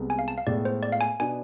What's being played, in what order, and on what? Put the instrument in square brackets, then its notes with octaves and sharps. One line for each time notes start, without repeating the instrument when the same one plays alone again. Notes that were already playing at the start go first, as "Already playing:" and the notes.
Already playing: [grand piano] C2 C3 G#3 B3
[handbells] G#5
F5
A5
F5
[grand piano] A2 G#3 B3 [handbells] D5
[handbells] C5
D5
F5
G#5
[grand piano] B2 B3 D4 [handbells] G#5